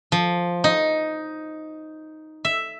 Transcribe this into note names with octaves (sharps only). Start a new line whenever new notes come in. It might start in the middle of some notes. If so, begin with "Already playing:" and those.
F3
D#4
E5